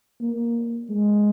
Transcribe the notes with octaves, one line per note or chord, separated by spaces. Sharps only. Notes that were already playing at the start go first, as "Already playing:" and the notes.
A#3
G#3